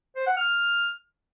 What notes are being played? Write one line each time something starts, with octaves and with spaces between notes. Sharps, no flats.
C5
F#5
F6